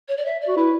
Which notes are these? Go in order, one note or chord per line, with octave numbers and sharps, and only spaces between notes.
C#5
D5
E5
D5
F#4
E4 B4